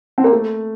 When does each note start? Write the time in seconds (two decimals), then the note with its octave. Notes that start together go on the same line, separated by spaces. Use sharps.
0.18 C4
0.24 A#3
0.32 A3